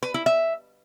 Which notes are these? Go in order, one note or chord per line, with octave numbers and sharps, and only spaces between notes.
B4
E4
E5